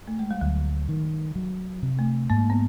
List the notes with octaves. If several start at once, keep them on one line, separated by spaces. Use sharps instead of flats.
A3
G#3
G3
D2 F#3
D#3
F#3
C3
A3
G#2 A#3
B3